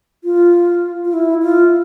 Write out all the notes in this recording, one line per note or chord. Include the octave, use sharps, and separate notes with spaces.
F4
F4
E4
F4